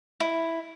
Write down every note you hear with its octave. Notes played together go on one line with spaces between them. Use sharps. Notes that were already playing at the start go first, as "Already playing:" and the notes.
E4